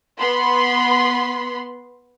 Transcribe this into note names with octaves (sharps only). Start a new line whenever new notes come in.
B3 B5 C6